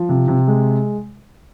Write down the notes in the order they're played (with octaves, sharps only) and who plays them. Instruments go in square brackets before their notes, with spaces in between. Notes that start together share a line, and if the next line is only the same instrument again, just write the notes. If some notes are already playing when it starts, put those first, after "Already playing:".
Already playing: [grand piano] F3
C3
C3
G#3